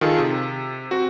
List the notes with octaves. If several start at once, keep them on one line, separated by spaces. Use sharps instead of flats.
D#3 F4 G#4 A4
C3
C4 F#4